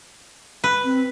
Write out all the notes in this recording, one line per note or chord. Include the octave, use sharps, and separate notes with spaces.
B4
C4